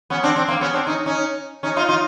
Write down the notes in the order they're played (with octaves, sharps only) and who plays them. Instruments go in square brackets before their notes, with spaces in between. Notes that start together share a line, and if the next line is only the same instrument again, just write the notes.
[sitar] B3 C#4
C4 D4
C4 D4
A#3 C4
B3 C#4
C4 D4
C#4 D#4
C#4 D#4
C#4 D#4
D#4 F4
D#4 F4